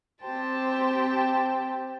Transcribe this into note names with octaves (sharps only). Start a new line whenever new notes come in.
C4 G4 C5 G5 A5